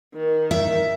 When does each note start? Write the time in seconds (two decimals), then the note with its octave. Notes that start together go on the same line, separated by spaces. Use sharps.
0.14 D#3
0.51 E5